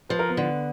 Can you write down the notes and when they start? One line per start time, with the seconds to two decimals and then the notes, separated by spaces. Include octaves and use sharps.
0.09 F3 B4
0.19 A#4
0.29 B3 B4
0.37 D3